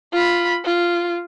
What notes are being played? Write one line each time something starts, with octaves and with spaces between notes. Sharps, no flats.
F4 B5
F4